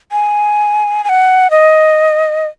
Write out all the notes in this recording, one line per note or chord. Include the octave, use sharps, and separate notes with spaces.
G#5
G#5
F#5
D#5